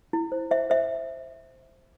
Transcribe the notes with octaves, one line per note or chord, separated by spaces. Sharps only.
E4
C5
C5 E5
C5 E5